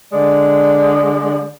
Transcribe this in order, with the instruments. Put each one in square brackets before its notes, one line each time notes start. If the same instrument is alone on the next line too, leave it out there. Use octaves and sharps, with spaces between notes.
[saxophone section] D3 G#3 D5